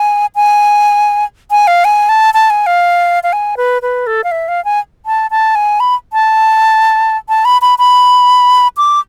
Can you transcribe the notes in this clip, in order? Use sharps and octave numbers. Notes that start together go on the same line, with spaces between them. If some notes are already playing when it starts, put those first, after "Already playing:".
Already playing: G#5
G#5
G#5
F5
G#5
A5
A5
G#5
F5
F5
G#5
B4
B4
A4
F5
E5
F5
G#5
A5
A5
G#5
B5
A5
A5
B5
B5
B5
D6